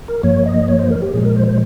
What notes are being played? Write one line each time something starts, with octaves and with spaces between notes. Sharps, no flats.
A#4
G2 F3 A#3 C#5
D#5
C#5
C5
A#4
G4
A#2 F3 G#3 G#4
A#4
C5
C5